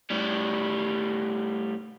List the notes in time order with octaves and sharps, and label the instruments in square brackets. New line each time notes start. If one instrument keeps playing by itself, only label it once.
[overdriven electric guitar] A2 G3